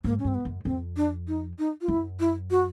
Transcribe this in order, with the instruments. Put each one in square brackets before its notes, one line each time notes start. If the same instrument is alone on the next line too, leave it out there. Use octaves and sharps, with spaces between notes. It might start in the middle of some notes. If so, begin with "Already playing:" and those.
[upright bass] G#2 [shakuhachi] A#3
[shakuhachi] C#4
[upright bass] G2 [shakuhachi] C4
[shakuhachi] B3
[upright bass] F#2
[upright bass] F2 [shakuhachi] C4
[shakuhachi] D4
D#4
D#4
F4
[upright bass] F#2 [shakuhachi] E4
[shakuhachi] E4
F#4